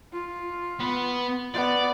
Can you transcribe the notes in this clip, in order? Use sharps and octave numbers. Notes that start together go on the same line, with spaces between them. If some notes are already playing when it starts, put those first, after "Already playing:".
F4
B3
B3 D5